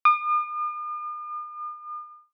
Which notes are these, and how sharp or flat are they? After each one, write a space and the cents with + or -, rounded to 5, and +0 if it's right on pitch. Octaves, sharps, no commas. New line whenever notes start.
D#6 -45